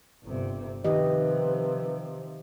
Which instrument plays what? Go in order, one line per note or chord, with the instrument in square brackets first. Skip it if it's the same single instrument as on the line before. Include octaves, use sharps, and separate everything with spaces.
[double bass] G1 C3
[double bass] C3 F3 [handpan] D#3 G4 D#5 [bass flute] B4